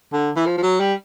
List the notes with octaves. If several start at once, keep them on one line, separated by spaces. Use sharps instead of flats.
D3
E3
F3
F3
F#3
G3